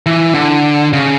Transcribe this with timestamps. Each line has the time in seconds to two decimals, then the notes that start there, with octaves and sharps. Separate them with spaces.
0.06 E3
0.34 D3
0.93 C#3